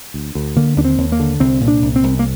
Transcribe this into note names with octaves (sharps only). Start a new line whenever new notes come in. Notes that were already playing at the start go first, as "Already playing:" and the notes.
D2
D2
D3 A#3
D#2 D4
C4
D#2
A#3
D3
C2 C4
A#2
D4
C2
C4
C2
A#3